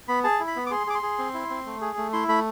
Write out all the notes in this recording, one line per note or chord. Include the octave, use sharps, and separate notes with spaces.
B3 B5
G#4 A5
E4
B5
B3
D6
G#4 C6
G#4 D6
C6
G#4
C4
E4
C4
A3
G#4
A3
E4 C6
A3 B5